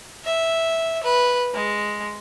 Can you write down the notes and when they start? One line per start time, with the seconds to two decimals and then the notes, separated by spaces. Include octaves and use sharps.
0.24 E5
1.03 B4
1.54 G#3